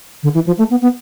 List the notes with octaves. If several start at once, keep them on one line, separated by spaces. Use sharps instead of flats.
D3
E3
F3
A3
B3
B3